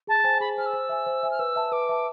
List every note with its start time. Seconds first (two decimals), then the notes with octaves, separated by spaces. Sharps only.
0.07 G#4 A5
0.24 C5 G#5
0.40 G#4 B5
0.57 C5 G#5 F6
0.65 E6
0.73 C5
0.89 E5 G#5
1.06 C5
1.23 E5 G#5
1.30 F6
1.39 B4 E6
1.56 E5 A5
1.72 B4 D6
1.89 E5 A5